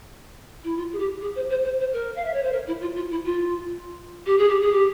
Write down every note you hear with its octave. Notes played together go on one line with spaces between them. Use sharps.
E4
F4
G#4
G4
G#4
C5
C5
C5
C5
A#4
F5
E5
C#5
C5
A#4
E4
F4
F4
E4
F4
G4
G#4
G4
G#4
G4